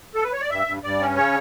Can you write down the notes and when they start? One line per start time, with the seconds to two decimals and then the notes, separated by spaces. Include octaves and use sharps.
0.15 A4
0.24 B4
0.32 C#5
0.41 D5
0.50 G2 E5
0.67 G2
0.83 G2 D5
1.00 C#4
1.16 C#3 C#5